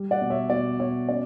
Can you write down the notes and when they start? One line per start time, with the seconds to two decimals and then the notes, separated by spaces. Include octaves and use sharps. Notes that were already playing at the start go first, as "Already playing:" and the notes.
Already playing: G3
0.11 D5 F#5
0.21 B2
0.30 C#5 E5
0.50 B2 D5
0.80 B2 C#5
1.09 C#4 D5